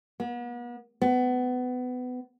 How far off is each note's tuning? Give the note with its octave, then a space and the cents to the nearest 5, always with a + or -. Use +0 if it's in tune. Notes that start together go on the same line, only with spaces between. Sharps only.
B3 -40
B3 +25